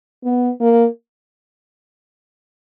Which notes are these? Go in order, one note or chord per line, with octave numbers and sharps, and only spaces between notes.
B3
A#3